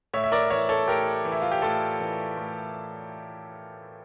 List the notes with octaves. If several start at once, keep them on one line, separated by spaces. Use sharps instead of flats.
A2 C#5 E5
E5
A#4 D5
E3 C#5 E5
A4 C#5
A2 G4 A#4
E3
E4
F4
G4
A2 F4 A4
E3
A2